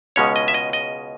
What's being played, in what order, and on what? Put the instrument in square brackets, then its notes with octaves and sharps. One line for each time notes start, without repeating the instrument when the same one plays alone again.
[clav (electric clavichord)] C#2 B2 G#3 C#4 C#5
D#5
E5
D#5
D#5